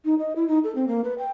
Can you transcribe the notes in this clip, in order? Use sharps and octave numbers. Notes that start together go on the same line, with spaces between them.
D#4
D#5
E4
D#4
A4
C4
A#3
B4
G5